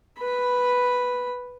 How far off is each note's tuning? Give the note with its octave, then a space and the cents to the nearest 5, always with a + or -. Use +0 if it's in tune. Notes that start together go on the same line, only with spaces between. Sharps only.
B4 +0 B5 +0